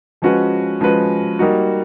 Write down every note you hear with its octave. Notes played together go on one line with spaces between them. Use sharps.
F3 G#3 C#4 F#4 B4
F3 G#3 C#4 F#4 B4
G3 A#3 D#4 F#4